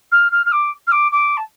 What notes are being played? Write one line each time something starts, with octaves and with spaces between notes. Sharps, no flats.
F6
F6
F6
D6
F6
D6
D6
A5